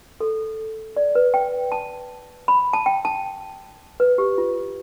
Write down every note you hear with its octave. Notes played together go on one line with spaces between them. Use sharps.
A4
D5
B4
G5
A5
B5
A5
G5
A5
B4
G4
F4